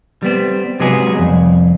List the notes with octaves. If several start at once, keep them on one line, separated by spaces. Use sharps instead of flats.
G3 B3 C4
C3 F#3 G#3 B3 G#4
C2 F2